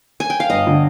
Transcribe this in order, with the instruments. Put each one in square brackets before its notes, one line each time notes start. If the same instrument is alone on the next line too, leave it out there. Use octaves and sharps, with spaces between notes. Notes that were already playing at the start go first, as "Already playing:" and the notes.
[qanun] G#5
G5
F5
[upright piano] G1 [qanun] D#5
[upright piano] D3